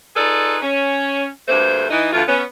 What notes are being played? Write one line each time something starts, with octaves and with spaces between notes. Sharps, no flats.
D#4 F4 G#4 A4 B4 D5
C#4
D2 G2 A3 A#3 C5
E3 D#4
D2 D3 E3 A3 F4
B3 C#4